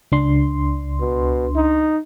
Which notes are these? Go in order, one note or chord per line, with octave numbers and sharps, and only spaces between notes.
C#2 D4 C6
B2
D#4